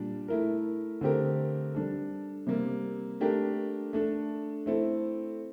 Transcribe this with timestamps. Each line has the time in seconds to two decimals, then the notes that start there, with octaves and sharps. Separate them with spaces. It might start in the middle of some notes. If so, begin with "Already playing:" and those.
Already playing: A#2 G3 D4
0.28 A3 E4 A#4
1.01 D3 A3 C4 G4 A#4
1.75 G3 D4 A4
2.47 C3 G3 A#3
3.20 A3 D4 G4 A#4
3.93 A3 D4 A4
4.66 A3 C4 E4 A4